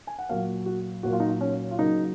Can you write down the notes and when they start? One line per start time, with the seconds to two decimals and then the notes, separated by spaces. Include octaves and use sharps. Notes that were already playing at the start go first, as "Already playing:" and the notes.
0.07 G#5
0.19 F#5
0.29 A#2 F#3 A#3 F5
0.66 F#4
1.03 A#2 F#3 A#3 F#4
1.13 F4
1.20 D#4
1.29 F4
1.41 C#4
1.71 F4
1.78 C#3 F#3 A#3 D#4